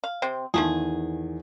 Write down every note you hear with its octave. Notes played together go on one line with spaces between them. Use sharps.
F5
C3 C4
E2 D#3 F3 A3 G#4